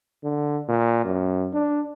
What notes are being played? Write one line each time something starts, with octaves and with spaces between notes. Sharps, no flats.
D3
A#2
F#2
D4